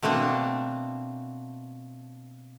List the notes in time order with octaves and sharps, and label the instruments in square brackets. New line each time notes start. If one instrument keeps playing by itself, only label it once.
[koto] B2 A3 A#3 C4 D4